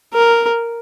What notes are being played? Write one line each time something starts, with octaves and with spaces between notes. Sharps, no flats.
A#4